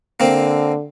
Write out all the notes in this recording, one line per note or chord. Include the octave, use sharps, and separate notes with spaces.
D3 A#3 C4